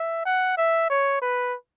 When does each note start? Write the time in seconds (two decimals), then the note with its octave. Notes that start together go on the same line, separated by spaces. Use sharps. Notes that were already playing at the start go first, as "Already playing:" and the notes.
Already playing: E5
0.25 F#5
0.58 E5
0.90 C#5
1.22 B4